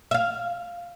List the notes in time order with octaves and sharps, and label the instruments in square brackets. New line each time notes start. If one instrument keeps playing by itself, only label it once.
[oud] E5 F5